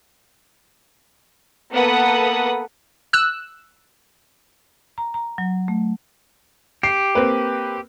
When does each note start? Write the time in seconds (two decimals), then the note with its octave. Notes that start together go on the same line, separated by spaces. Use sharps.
1.72 A#3 B3 A4 B4 F#5 D#6
3.13 E6 F#6 E7
4.98 A#5
5.14 A#5
5.38 F#3
5.68 A3
6.83 G4 C7
7.15 A#3 C4 B4